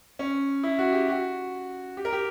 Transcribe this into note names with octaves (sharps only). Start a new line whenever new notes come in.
C#4
E4
F#4
G4
F#4
G4
A#4
G4